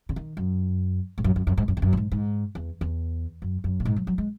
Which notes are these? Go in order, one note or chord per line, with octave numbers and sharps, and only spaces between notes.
C#3
D#3
F#2
G#2
F#2
F#2
F#2
G#2
F#2
E2
F#2
A#2
G#2
G#2
E2
E2
F#2
F#2
A#2
G#2
F#3
F#3
G#3